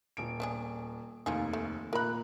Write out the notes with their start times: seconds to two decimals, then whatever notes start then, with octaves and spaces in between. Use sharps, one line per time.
0.17 D#1 D7
0.40 B3 D4 G#4
1.26 F1 D#2 C4 F4 G#4
1.53 A3
1.93 A#2 A#4 A#5 B5 F#6